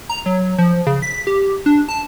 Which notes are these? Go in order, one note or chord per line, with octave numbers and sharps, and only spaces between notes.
A#5
F#3
F3
C#3
B6
G4
D4
A5